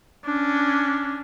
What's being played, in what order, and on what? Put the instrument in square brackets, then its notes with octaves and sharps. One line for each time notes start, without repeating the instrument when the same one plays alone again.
[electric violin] C#4 D4